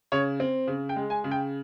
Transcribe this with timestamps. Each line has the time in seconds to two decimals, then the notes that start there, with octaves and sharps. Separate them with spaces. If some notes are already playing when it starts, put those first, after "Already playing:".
0.12 C#3 C#5
0.40 C4
0.67 C#3
0.89 G5
0.96 G#3
1.10 G#5
1.24 C#3
1.31 G5